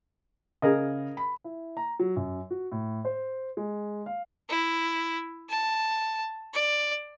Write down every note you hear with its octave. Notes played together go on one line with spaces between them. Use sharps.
C#3 G#4 A#4 D#5
B5
E4
A#5
F#3
F#2
F#4
A2
C5
G#3
F5
E4
A5
D5